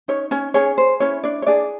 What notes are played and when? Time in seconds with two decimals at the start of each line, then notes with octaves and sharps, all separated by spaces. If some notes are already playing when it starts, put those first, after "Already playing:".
0.08 C#4 D#4 C#5
0.31 C#4 C#5
0.54 C#4 G#4 C#5
0.78 C5
1.00 C#4 E4 C#5
1.24 D4 D5
1.42 C#5
1.47 D4 G#4 D5